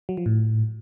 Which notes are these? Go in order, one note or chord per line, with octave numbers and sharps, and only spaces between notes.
F#3
F3
A2